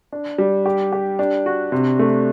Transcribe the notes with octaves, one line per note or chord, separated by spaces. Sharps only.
D4
G3
G4
G4
D4
F#4
C3
A3